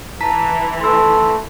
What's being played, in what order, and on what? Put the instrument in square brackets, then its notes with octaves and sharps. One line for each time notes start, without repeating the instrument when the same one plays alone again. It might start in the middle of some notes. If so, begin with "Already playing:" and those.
[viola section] E3 [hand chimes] A5 A#5 B6
[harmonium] A3 [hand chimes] C6 E6